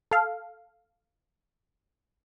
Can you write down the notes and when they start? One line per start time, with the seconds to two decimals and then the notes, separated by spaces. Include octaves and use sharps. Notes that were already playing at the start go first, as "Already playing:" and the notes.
0.11 A4 F5